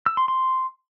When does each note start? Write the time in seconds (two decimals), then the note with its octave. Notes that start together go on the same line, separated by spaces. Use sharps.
0.06 E6
0.17 C6
0.28 C6